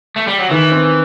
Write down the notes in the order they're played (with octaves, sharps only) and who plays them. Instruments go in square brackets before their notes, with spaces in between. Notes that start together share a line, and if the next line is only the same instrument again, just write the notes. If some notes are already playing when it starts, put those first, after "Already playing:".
[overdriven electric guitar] A3
G3
F#3
[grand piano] D#3 [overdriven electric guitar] E3
[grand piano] C4